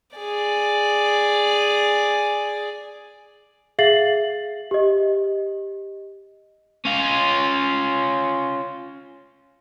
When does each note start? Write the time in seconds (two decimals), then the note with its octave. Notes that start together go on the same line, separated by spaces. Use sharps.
0.17 G#4 D5
3.79 G#4 E5 F5 A6 C7 F#7
4.71 G4 D#5
6.85 C#4 F4